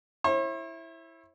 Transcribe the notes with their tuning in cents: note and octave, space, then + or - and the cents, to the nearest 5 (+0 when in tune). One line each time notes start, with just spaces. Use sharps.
E4 +0 C#5 -45